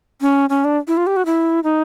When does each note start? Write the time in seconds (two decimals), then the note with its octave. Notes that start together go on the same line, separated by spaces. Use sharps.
0.22 C#4
0.50 C#4
0.64 D4
0.88 E4
0.97 F4
1.07 G4
1.16 F#4
1.26 E4
1.64 D#4